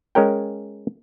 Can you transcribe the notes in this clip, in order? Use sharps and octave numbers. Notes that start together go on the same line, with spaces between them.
G#3 C#4 A#4 G5